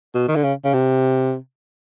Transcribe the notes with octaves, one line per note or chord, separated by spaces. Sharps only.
B2
D#3
D3
C#3
C#3
C3